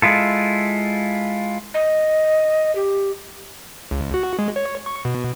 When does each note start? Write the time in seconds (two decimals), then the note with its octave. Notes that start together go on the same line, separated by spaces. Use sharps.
0.02 G#3 E4 F4 A4
1.74 D#5
2.75 G4
3.91 C#2
4.14 F#4
4.39 G#3
4.56 C#5
4.86 C#6
5.05 B2